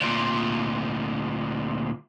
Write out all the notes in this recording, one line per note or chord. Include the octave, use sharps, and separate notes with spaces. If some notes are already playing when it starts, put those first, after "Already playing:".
D2 A#2